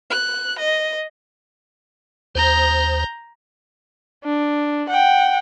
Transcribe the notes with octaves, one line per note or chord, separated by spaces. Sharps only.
F#6
D#5
D#2 C5 A#5 G6
D4
F#5 G5